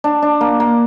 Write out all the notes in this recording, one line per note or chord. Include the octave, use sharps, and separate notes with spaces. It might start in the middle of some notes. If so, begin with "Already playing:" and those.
D4
D4
A#3
A#3